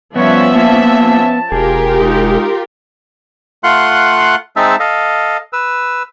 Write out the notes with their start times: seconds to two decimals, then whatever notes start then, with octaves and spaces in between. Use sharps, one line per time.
0.16 F3 G3 B3 C#4 B4 C#5 E5
0.55 A#3 A5
1.52 E1 F4 G4 G#4 A#4
1.98 G#3 D#4
3.64 A3 F4 F5 F#5 C6 F#6
4.56 G#3 C4 D#4 E5 A5 E6
4.80 A4 D#5 F5
5.53 B4 E6